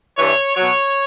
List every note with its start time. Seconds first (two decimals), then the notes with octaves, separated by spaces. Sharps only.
0.17 G2 E3 C#5
0.56 B2 F#3 C#5